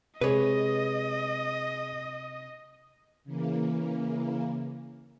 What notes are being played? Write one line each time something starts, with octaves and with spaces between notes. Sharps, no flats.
C3 G#3 G#4 B4 C#5 D#5
C#3 E3 A#3